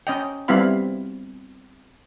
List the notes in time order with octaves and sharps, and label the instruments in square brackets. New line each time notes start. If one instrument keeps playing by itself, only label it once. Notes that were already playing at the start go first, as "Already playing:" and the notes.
[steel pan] C#4 D#5 G5
G3 B3 C4 E4 F5 B5